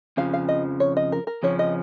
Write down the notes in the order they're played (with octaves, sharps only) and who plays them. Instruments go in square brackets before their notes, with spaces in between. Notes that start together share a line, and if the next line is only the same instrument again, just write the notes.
[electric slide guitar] F2 C#3 F3 [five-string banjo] F5
[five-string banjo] F5
D#5
C#5
D#5
A#4
A#4
[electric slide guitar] F2 C#3 F3 C#4 [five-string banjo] C#5
[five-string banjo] D#5